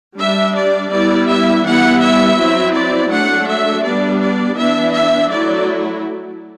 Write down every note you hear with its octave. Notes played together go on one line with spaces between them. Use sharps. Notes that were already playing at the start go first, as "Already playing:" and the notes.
G3 D4 E5
D5
G3 B3 E4 D5
E5
E3 G3 B3 E4 F#5
E5
F#3 C4 E4
D5
F#3 A3 D4 F#5
E5
G3 B3 D4 D5
D5
E3 B3 D4 E5
E5
F#3 A3 E4 D5